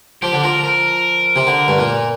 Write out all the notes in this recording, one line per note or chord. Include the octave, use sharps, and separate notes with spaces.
F3 G4
D3
F3 A#4
A#4
C3
D3
G2
A#2